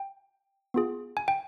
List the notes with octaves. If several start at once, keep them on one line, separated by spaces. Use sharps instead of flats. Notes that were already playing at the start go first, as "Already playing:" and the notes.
Already playing: G5
B3 F4 G#4
G#5
G5